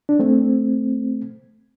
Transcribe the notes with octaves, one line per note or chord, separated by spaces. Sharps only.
D4
A3 C4